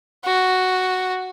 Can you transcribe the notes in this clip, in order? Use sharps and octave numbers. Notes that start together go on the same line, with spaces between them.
F#4